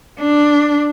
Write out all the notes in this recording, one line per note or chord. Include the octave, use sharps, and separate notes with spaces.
D4